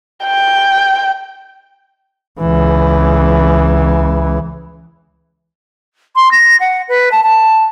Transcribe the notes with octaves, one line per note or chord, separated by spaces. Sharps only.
G5
C#2 E3
C6
A#6
F#5
B4
A5
A5